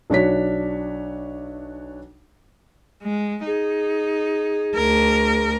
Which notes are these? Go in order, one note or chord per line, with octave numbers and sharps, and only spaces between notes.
B1 D4 F#4 C#5 B6
G#3
D#4 G#4
D2 A#4